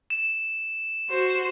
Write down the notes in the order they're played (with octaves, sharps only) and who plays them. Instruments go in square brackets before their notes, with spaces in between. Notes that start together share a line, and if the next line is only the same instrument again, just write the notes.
[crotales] E7
[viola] F#4 C5